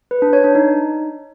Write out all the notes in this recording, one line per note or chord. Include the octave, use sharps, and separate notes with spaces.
B4
D4
C#5
D4
D#4